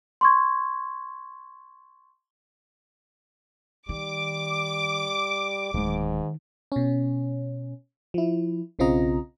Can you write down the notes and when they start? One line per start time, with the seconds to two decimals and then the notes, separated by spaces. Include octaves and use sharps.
0.21 C6 C#6 G#6
3.89 D#3 G3 D6
5.74 D1 G#2 D3 D#3 G#3
6.72 B2 C#4
8.14 F3 E4
8.79 B1 C#3 C4 F4 D#5 A#5